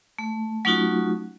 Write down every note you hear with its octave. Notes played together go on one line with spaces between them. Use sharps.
A3
F#3 A3 C#4 D#4 F4 F#4